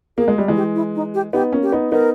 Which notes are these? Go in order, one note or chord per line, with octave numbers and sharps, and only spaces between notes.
A#3 G#4
G#3
G3 G#4
E3 G#3
G4
E4
D#4
G4
B3 D#4 G4
A#3 C#4
G4
B3 D#4
B3 D#4 A#4